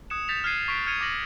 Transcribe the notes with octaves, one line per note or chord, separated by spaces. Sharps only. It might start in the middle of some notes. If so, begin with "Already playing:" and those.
D#6 F#6 G#6 C#7 E7
G6 A6 B6 E7 F7
F6 F#6 G#6 C7 D#7 F#7
C#6 B6 D7
C#6 F6 G#6 C#7 D#7 F7
D6 F6 A6 A#6 F#7